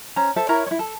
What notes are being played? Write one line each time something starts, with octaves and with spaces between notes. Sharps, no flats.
C#4 C5 A#5
A4 C5 E5
E4 A#4 C#5 A#5
E4 C#5
A4